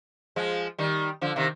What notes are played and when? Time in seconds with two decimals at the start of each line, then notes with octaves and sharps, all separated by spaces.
0.36 F3 G#3
0.78 D#3 G3
1.21 D3 F3
1.36 C3 D#3